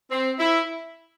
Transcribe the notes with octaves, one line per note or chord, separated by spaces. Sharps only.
C4
E4